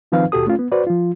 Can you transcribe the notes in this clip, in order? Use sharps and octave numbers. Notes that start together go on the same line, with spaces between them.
D#3 F3 C4 D#4 B4 F5
D#2 B2 F#4 G4 A4 D#6
A3 C#4 F4
B3
F#4 B4 C5 D5
F3 F4